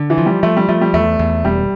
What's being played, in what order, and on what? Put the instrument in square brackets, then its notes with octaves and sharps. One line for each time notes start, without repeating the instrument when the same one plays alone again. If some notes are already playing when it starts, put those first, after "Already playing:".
Already playing: [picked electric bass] D3
[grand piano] E3
[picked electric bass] F3
[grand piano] G3
[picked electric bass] F3 [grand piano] A3
[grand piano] G3
[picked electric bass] F3 [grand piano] A3
[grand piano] G3
[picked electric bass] E2 [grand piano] A3
[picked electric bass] E2
[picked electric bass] E1 [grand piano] G3